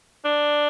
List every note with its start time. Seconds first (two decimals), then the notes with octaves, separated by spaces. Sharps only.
0.24 D4